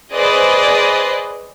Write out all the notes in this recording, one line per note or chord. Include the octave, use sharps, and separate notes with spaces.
G#4 B4 C5 D5 D#5